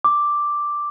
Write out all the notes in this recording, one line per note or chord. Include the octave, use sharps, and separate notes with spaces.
D6